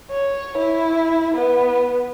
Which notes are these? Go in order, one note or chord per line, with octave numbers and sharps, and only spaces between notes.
C#5
E4
B3